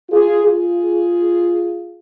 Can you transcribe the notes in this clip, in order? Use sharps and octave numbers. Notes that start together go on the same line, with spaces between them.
F4 G#4
F4 G#4